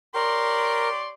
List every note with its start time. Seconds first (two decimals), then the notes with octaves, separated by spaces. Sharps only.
0.15 G4 A#4 C#5 D5 C6